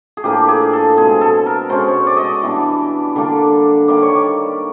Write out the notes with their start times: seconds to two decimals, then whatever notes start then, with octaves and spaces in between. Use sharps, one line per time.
0.17 G#4
0.24 A2 F3 A#3 D4 G4
0.48 G#4
0.73 A4
0.96 B2 G#3 C4 G#4
1.21 A4
1.46 A#4
1.69 B2 G#3 C#4 C5
1.88 C#5
2.07 D5
2.17 D#5
2.25 D5
2.43 E3 G3 B3 D4
3.15 D3 G3 A#3 D4
3.88 D#3 G3 A#3 D5
4.02 C#5
4.15 D5